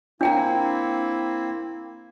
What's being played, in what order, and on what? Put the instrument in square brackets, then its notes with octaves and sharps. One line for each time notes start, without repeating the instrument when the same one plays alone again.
[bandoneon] A#3 C4 [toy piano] D4 G5 A#5 [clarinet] E4